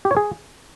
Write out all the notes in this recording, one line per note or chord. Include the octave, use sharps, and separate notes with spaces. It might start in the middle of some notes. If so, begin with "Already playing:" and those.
G4
C#5
G#4